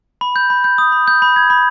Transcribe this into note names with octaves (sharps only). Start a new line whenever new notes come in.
B5
G6
B5
G6
D#6
B5
G6
B5
G#6
B5